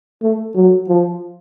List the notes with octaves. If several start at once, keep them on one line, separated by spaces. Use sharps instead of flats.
A3
F#3
F3